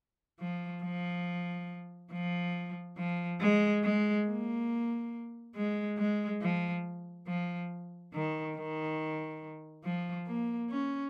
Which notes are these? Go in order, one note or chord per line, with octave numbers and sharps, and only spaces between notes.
F3
F3
F3
F3
G#3
G#3
A#3
G#3
G#3
F3
F3
D#3
D#3
F3
A#3
C#4